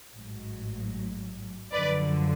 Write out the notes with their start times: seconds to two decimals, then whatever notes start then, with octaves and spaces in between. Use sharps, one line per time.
0.14 A1 G#2 F#3
1.72 F#2 D3 F3 B4 D5